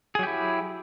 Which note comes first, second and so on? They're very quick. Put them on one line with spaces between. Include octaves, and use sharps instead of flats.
G#4 F#3 G4 E4